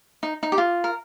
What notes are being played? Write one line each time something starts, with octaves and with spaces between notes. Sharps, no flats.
D#4
D#4
G4
F4
A#4